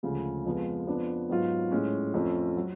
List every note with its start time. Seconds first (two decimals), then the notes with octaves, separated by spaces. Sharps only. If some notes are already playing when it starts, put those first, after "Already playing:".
0.03 D2 C#3 F3 G#3
0.45 F2 F3 G#3 B3 F4
0.87 F2 F3 B3 D4
1.30 G#2 F#3 B3 F4
1.71 A2 G#3 C#4
2.13 F2 F3 A3 C#4
2.57 F#3